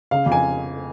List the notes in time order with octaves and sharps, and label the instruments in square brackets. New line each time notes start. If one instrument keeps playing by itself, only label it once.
[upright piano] C#3 F5
F2
G#5